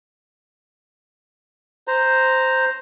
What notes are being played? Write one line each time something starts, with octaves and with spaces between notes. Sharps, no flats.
C5 A#5